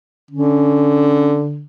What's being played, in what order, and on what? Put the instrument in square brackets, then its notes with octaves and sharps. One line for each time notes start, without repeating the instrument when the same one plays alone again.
[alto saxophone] D3 [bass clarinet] C#4